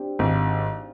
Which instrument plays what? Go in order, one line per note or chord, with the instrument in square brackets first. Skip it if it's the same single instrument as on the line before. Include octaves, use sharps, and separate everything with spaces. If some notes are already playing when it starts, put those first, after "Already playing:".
Already playing: [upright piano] C4 D4 G4
[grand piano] G#1 [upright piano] F4